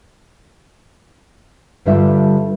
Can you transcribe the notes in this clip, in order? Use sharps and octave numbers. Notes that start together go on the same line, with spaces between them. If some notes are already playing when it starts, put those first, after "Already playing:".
G2 D3 G3 D4 F4 E5